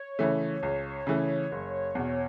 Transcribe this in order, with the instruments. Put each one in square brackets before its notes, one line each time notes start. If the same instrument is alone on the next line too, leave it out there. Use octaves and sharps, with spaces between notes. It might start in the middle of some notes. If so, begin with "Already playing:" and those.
Already playing: [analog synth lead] C#5
[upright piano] C#3 E3 A3
C#2
C#3 E3 A3
F#1
E2 B2